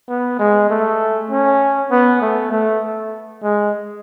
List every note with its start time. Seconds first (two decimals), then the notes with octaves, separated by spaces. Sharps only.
0.09 B3
0.39 G#3
0.70 A3
1.31 C#4
1.91 B3
2.21 A3
2.52 A3
3.43 G#3